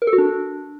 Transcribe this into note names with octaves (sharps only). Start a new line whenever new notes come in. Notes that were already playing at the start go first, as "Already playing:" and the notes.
A#4
A4
F#4
D4